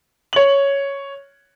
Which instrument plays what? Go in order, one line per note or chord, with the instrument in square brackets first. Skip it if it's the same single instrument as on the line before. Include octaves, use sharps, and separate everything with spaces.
[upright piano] C#5 F#7